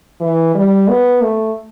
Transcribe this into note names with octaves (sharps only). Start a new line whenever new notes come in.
E3
G3
B3
A3